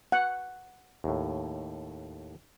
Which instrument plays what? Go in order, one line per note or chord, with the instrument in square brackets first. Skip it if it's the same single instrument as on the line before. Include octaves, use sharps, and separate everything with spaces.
[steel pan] F#5
[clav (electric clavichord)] D#2 A2